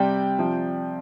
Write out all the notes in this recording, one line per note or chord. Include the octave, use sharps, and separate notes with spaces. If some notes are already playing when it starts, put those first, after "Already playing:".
Already playing: C3 G3 D5 G5
C3 F3